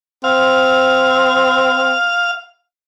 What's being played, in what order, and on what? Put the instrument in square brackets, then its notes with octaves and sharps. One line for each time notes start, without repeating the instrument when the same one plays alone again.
[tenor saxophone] C4 [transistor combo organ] F5